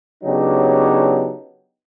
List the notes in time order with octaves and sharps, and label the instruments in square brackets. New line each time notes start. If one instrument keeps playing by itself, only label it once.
[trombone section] C#3 F#3 B3 D4 D#4 G4